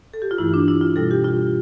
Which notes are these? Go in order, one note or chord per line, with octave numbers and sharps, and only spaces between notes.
A4
G4
F4
G2 E3 A3 E4
D4
E4
F4
B2 G3 A4
G4
F4